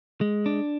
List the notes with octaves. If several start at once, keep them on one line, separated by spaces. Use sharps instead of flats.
G#3
D4